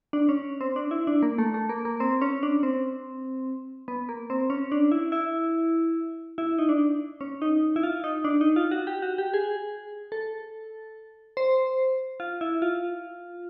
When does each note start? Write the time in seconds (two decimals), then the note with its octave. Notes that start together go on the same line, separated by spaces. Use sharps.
0.13 D4
0.29 C#4
0.61 C4
0.76 D4
0.91 E4
1.07 D4
1.23 A#3
1.38 A3
1.54 A3
1.69 A#3
1.85 A#3
2.00 C4
2.22 C#4
2.43 D4
2.63 C4
3.88 B3
4.09 A#3
4.30 C4
4.50 C#4
4.72 D4
4.92 E4
5.12 E4
6.38 E4
6.59 D#4
6.69 D4
7.21 C#4
7.42 D#4
7.76 E4
7.83 F4
8.04 D#4
8.24 D4
8.41 D#4
8.56 F4
8.71 F#4
8.87 G4
9.02 F#4
9.18 G4
9.34 G#4
10.12 A4
11.37 C5
12.20 F4
12.41 E4
12.62 F4